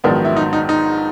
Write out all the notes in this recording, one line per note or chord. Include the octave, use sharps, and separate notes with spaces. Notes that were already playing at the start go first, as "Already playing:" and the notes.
A#1 G#2 D#3 F#3 B3 D4
E4
D#4
D#4
D#4